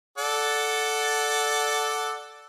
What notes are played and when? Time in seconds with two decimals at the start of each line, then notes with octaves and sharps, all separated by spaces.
0.18 A4 D5 F#5